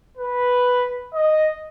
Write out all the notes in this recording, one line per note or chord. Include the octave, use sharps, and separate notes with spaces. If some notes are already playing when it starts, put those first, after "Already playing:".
B4
D#5